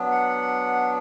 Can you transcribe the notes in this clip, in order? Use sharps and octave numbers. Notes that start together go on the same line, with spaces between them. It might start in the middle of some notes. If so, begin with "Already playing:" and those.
Already playing: F#3 B3 D4
F#5